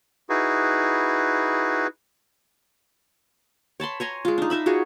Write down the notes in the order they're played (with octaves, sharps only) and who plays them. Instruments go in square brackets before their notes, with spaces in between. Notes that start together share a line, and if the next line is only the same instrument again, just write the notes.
[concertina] D#4 E4 F#4 G#4 B4
[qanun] C#5 A5 B5 C6
C#5 G#5 A#5 C6
G#3 F4
D4 D#4
D4 D#4 E5 B5
F4 F#4 G#4 C#5